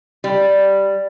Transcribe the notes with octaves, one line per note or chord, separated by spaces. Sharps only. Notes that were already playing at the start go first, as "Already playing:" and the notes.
G3